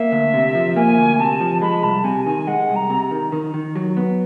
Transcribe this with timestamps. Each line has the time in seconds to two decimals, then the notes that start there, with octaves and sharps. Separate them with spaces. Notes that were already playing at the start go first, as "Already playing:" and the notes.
Already playing: A#3 E5
0.12 D2
0.34 C3
0.55 F3
0.76 A#3 G#5
0.98 D2
1.19 C3 A5
1.40 F3
1.61 G#3 B5
1.83 C2 A5
2.04 C3 G#5
2.26 D#3 G#5
2.47 G#3 F#5
2.68 C2
2.75 A#5
2.90 C3
3.11 D#3
3.32 D#3
3.54 D#3
3.75 F#3
3.97 B3